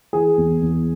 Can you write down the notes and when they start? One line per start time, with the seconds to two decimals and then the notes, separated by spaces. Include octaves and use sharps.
0.13 E3 G#4
0.38 E2
0.62 E2